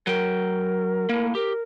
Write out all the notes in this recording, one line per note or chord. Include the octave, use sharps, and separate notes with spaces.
F#3 A#4 G5
A2 A#3
G4 A#4